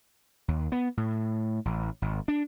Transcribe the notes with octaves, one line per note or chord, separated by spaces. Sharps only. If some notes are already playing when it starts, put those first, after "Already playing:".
D#2
B3
A2
A1
G#1
D4